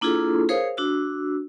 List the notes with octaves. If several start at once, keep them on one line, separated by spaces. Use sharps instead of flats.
A#3 D4 E4 F4 G#4 A4
G#4 A#4 C5 C#5 F5 D#6
D4 F#4 E6